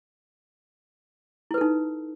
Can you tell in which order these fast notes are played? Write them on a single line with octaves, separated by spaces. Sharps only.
E4 B4 A4 D#4